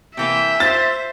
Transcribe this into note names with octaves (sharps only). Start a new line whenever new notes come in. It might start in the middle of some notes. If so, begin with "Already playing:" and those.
C3 E3 A#3 E5 G5 G#5
F4 C5 A6